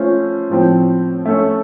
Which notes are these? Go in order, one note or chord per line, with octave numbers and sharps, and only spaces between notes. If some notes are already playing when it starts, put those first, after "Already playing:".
Already playing: A3 C#4 F4 C5
A2 F3 C4
A3 C#4 A4